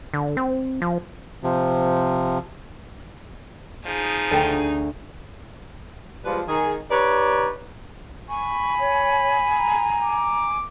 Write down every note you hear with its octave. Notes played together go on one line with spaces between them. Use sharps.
D3
C4
F3
C3 F3
F3 D#4 G#4
D2 A4 G5
F3 G3 G#3 F4 B4
D#3 G#4
D#4 G4 B4 C#5 D5
G#5 B5 C#6
C#5
A#5
D6